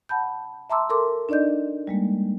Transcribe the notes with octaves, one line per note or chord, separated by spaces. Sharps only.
F#5 A5 B5 G6
E5 A5 A#5 C6 D6 E6
A4 A#4 C6 D6
D4 D#4 D5 D#5 G6
G3 G#3 A#3